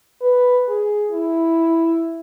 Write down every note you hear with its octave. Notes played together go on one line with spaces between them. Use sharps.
B4
G#4
E4